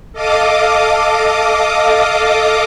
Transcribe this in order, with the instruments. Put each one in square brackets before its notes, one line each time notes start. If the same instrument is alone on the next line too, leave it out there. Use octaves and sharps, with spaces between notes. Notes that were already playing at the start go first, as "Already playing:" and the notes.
[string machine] A4 D#5 F5 D6 D#6